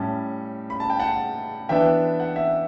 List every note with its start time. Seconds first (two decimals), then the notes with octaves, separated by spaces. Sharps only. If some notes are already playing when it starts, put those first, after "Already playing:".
Already playing: A2 G3 C#4 A5
0.70 B5
0.80 A5
0.90 G5
0.99 F#5 A5
1.69 E3 B3 D4 E5 G5
2.20 F#5
2.36 E5